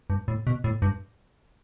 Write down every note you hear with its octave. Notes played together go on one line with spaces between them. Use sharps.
G2
A2
B2
A2
G2